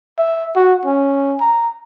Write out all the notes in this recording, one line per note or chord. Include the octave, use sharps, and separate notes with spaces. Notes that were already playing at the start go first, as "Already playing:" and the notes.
E5
F#4
C#4
A#5